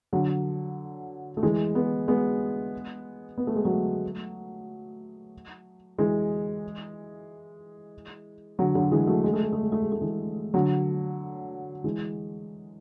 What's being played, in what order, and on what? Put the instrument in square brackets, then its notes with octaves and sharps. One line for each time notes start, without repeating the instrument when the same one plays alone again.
[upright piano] D3 F#3
A3
E3 G#3
G#3 B3
G#3 B3
B3
A3
G#3
F#3 A3
E3 G#3
D3 F#3
D3 F#3
E3 G#3
F#3 A3
G#3
A3
G#3
A3
G#3
A3
G#3
A3
E3 G#3
D3 F#3
E3 G#3